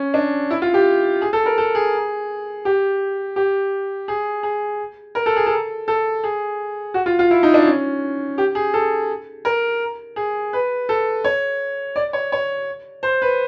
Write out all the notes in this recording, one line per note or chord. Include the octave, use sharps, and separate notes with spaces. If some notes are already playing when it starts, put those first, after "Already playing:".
Already playing: C#4
D4
E4
F4
G4
G#4
A4
A#4
A4
G#4
G4
G4
G#4
G#4
A#4
A4
G#4
A4
A4
G#4
F#4
F4
F4
E4
D#4
D4
C#4
G4
G#4
A4
A#4
G#4
B4
A4
C#5
D5
C#5
C#5
C5
B4